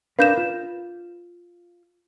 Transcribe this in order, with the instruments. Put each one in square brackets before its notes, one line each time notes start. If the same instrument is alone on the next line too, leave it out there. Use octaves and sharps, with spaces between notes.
[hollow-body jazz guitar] D4 A#4 B4 [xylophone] F5 G6 E7
[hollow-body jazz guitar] F4